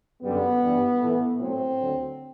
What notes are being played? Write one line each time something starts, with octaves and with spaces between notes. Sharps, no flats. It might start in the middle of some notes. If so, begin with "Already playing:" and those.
F#2 D3 G3 B3
G2 E3 G3
A2 E3 A3
A2 F#3 A3 C4
D2 D3 F#3